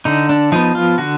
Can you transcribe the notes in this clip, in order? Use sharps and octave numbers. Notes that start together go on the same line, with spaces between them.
D3 D#4
D4
F3 B3 D#4
F4
D3 F#4